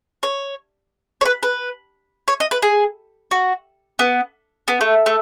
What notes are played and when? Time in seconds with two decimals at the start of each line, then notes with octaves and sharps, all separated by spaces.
0.23 C#5
1.21 C#5
1.25 B4
1.43 B4
2.28 C#5
2.40 D#5
2.51 B4
2.63 G#4
3.31 F#4
3.99 B3
4.68 B3
4.81 A3
5.06 A3